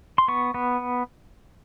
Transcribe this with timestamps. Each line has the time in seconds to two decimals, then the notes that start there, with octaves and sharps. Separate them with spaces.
0.18 C6
0.28 B3 C#6
0.54 B3